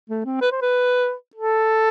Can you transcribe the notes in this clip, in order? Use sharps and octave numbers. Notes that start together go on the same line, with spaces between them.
A3
C4
B4
C5
B4
A4